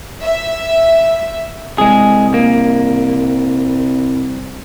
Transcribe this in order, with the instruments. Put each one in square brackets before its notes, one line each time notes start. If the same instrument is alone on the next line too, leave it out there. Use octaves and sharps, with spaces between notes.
[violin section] E5
[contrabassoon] C2 [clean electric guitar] G#3 G#4
[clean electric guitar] A#3